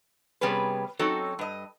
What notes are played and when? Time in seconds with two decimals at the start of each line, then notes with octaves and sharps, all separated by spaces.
0.41 C3 G3 B3 C#4 G#4 B4
0.99 F#3 C4 C#4 D#4 F#4 A4
1.39 G2 D#5